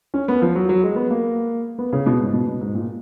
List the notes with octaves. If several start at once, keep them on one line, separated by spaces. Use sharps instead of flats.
C#4
B3
F3
F#3
F#3
G#3
B3
A#3
B3
C#3
B2
G#2
B2
B2
G#2
A#2